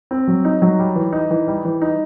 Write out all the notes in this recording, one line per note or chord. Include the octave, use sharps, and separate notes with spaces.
C4
F#3
D#4
F#3
G3
E3
D#4
E3
G3
E3
D#4